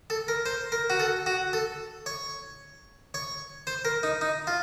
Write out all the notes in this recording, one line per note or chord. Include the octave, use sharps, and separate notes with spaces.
A4
A#4
C5
A#4
F#4
A4
F#4
A4
C#5
C#5
C5
A#4
D#4
D#4
F4